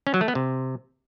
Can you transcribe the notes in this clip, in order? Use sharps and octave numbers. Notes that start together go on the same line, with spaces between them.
C#4
F#3
A3
B3
C3